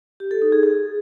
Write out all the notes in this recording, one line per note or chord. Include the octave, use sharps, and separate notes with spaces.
G4
A4
D#4
G#4
G#4